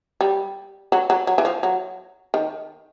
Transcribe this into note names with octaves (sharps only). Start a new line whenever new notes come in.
G3
F#3
F#3
F#3
E3
F3
F#3
D#3